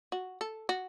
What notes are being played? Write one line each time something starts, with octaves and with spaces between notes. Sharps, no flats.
F#4
A4
F#4